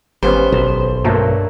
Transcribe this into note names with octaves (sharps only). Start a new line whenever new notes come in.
G#1 G3 B3 C#4 C5
B1
G2 F#3 A3 A#3